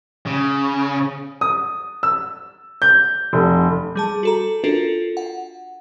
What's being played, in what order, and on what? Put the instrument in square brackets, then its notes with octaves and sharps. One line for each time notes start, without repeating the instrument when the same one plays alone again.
[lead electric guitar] C#3
[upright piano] D#6
E6
G6
F1
[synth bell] G3 G#4 A5
F#4 A4 A#5
D4 F4 F#4 A4 A#4
F#5